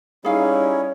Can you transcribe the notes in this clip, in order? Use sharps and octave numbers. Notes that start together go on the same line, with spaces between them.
G3 C#4 D#4 E4 G#4 C#5 F5